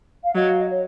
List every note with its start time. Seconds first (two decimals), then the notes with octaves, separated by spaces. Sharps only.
0.24 F5
0.35 F#3 D#5
0.48 F5
0.58 D#5
0.70 C#5